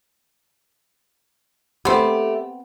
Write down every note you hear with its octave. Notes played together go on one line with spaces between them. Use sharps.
A3 B3 C4 G4